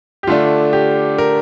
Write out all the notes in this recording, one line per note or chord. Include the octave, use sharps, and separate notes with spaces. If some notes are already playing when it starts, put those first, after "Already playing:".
G4
D3 A3 D4 F4
G4
A#4